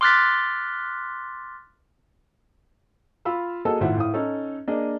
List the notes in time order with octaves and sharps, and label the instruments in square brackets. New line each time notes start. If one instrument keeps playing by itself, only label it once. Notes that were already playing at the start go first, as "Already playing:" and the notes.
[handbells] C6 D6 F6 F#6 A6 B6
[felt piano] F4 F5 B5 E6
A#3 F#4 G#4 A4 D#5 A5
G#1 A2 F4 E5 F#5
A2 F5 D#6
C#4 D#4 A4
A#3 D4 G#4 D#5